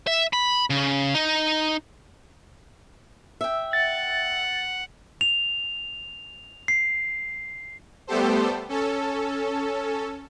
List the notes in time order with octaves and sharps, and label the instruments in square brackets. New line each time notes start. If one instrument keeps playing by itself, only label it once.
[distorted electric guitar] E5
B5
C#3
D#4
[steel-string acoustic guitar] E5 G5
[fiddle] F#5 [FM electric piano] A6
[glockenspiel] F7
C7
[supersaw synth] G3 A3 B3 G4 A4 C5
C#4 A4